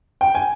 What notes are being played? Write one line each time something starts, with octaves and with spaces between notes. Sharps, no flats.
G5
G#5